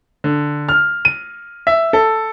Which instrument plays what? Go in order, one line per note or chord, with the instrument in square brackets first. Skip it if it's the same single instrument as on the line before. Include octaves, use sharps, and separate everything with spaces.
[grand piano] D3
F6
D#7
E5
A4